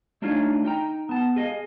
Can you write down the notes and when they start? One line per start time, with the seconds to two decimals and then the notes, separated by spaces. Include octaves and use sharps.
0.22 A3 D4 D#4 F4 C#5 F5
0.65 D#4 G5 A#5
1.09 B3 A5
1.36 G#4 D#5 F5